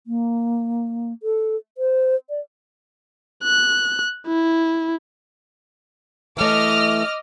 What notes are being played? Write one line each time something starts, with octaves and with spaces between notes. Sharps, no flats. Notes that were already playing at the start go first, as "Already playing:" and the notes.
A#3
A4
C5
D5
F#6
E4
E3 A3 D#5 D6 F6